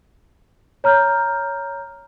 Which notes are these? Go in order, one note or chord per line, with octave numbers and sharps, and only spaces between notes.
C#5 A#5 F6 G6